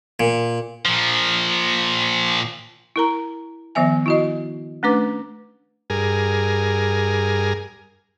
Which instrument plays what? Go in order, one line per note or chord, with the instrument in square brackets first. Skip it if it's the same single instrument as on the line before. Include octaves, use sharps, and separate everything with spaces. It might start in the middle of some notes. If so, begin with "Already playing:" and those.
[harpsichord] A#2
[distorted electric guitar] A#2 F3
[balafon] E4 A#4 A#5
D#3 F3 B3 E5 G#5
E4 F#4 D#5
A3 C#4 D4 B4 D6
[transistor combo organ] G2 G#4 A#4